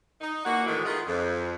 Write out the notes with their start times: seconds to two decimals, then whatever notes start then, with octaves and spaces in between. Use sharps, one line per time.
0.21 D#4
0.45 E3 A#3 D4 F#4
0.66 D2 A2 D#3 E3 G#3 B3
0.85 D#3 F4 G#4 A#4 B4 D#5
1.06 F2